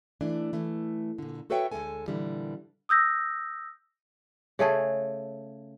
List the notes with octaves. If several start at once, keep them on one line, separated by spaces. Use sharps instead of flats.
E3 A3 D4
E3 A3
A#2 D3
F#4 A4 B4 C#5 E5 G5
D2 G2 G#3 A4 G#5
A#2 D3 E3 G3
D#6 E6 G6 A#6
C#3 A3 G#4 A4